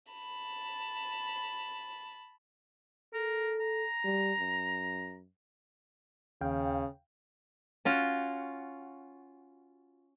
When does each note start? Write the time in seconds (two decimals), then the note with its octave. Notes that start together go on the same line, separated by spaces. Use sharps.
0.12 A5 B5
3.13 A4 A#4
3.60 A#5
4.04 G3
4.40 F#2
6.41 D#2 C#3 F5 G5
7.85 C#4 F4 F#4